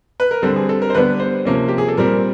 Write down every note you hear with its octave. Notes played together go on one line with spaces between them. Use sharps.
B4
A#4
D3 G3 C4 A4
G#4
A4
A#4
C5
D3 G3 B3 D4 B4
C5
C3 F3 A#3 C#4
G4
G#4
A4
A#2 G3 C4 A#4